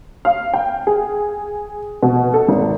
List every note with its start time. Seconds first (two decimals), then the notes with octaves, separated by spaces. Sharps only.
0.25 F5
0.53 G5
0.87 G#4
2.03 B2
2.34 A4
2.48 G#1